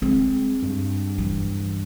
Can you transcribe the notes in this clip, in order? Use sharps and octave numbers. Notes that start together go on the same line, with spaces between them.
G#3 C4
G2
E3